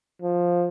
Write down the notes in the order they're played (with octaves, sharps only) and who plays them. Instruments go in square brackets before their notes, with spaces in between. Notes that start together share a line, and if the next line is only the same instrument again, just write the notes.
[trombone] F3